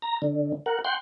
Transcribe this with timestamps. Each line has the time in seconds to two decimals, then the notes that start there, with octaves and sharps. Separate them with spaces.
0.02 A#5
0.22 D3
0.66 A#4 F#5
0.85 F#5 G5 C6